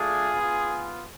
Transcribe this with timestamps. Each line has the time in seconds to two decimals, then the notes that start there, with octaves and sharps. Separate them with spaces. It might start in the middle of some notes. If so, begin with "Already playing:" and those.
Already playing: A3 D4 F4 G#4
0.35 B3 F4